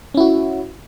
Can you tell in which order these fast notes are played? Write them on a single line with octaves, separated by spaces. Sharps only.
C#4 E4 F#4